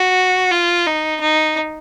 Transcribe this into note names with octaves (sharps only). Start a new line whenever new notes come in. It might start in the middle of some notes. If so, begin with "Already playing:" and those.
Already playing: F#4
F4
D#4
D#4